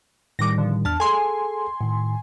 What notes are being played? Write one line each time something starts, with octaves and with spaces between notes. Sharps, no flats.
A2 D#3 G3 D6 A#6
D3 F3
E2 D4 A5 F6
G#4 A4 G#5 C6
A2 D#3